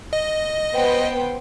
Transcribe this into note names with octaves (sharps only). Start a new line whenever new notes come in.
D#5
B3 C5 G5